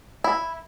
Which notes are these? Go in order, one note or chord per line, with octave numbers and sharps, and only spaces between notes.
E4